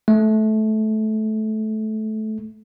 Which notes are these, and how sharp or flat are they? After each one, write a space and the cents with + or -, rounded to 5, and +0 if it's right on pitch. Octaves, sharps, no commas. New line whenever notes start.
A3 -20